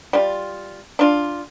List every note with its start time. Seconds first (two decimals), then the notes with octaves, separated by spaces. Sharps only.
0.13 G3 F4
0.99 D4 F4